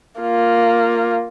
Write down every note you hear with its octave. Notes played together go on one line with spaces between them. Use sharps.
A#3 F4